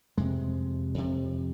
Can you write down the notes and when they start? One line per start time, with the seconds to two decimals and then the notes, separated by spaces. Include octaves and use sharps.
0.18 F2 C3 G#3
0.94 F2 C3